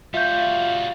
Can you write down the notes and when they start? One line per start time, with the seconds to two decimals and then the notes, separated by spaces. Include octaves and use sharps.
0.14 G3 F4 F#4 E5 G6